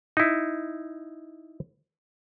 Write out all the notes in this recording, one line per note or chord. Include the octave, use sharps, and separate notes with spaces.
D#4 E4